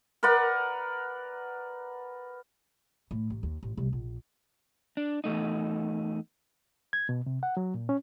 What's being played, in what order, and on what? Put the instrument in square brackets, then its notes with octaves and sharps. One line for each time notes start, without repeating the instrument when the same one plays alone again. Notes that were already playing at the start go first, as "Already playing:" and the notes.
[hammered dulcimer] A#4 B4 D5 F#5
[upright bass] A2
A1
D#2
A1
C2
A#1
[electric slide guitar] D4
E2 G#2 A3 D#4
[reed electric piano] G#6
B2
C3
F#5
F#3
A#2
C#4